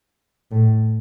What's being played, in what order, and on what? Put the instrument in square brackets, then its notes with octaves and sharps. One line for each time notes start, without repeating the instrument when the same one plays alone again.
[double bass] A2